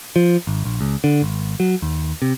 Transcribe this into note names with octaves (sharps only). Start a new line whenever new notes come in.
F3
G#1
A#1
C#2
D3
G#1
F#3
D#2
C3